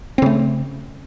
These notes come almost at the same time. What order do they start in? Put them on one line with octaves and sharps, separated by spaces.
C4 C#3 A3